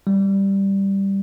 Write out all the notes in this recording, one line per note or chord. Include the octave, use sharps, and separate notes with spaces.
G3